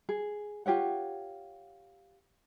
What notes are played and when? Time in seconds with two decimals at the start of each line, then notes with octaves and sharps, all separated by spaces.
0.09 G#4
0.66 F4 G4 C#5 F#5